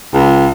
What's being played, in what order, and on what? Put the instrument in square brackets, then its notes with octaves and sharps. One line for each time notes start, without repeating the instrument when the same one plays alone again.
[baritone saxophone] C#2